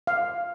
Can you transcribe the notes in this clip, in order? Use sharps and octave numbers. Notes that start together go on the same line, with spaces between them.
F5